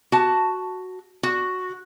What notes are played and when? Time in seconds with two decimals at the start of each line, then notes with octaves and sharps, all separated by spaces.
0.12 F#4 A5
1.23 F#4